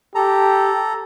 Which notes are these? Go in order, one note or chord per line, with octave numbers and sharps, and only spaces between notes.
G4 A4 A#5